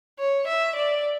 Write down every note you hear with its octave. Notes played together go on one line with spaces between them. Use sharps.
C#5
E5
D5